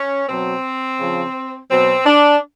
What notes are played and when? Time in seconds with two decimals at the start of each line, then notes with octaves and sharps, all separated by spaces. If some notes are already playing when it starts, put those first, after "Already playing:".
Already playing: C#4
0.29 B2 F#3 C4
0.99 C#3 F3
1.70 B2 F#3 C4
2.06 D4